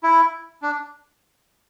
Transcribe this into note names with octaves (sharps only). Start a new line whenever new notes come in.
E4
D4